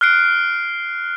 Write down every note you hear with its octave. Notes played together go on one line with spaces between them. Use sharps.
F6 F#6 C7 D7